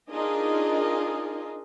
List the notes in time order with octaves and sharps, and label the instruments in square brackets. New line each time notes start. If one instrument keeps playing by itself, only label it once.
[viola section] D4 D#4 F4 G#4 A#4 D#5